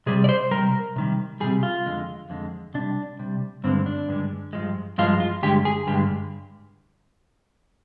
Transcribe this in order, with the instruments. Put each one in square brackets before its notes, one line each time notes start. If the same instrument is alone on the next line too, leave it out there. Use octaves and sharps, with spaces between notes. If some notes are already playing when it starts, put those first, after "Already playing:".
[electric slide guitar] C3 G3 G#4
D5
C5
C3 G3 A#4
C3 D#3 G3
C3 D#3 G3 G#4
F4
F2 D3 G#3
F2 D3 G#3
C3 G3 D4
C3 G3
G2 D3 G#3 C4
D4
G2 D3 G#3
G2 F3 G#3
G2 F3 G#3 F4
F4
G2 D3 G#3 G4
G#4
G2 D3 G#3 G4